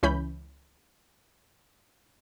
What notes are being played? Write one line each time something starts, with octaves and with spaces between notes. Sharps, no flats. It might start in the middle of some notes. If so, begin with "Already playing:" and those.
C#2 E3 C#4 B5 G6